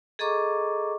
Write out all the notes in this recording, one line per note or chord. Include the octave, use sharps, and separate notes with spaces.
G#4 A4 D#5 A#5 C#6 D6